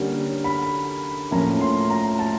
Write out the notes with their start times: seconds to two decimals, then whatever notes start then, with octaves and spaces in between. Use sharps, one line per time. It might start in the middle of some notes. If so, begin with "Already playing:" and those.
Already playing: D3 G3 A#3 C#4
0.44 B5
1.31 A2 F3 A#3 C#4 A#5
1.61 C6
1.90 A#5
2.19 A5